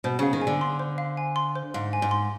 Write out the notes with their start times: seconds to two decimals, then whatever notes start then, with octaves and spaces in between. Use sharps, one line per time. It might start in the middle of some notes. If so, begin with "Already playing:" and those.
0.04 B2 C5
0.19 C#3 F5
0.33 D#3
0.42 G#5
0.47 D3
0.61 C6
0.79 C5
0.98 F5
1.17 G#5
1.36 C6
1.56 C5
1.74 G#2 F5
1.93 G#5
2.02 G#2
2.11 C6